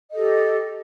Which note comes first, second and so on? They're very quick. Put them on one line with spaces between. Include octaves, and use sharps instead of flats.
D#5 A4 G4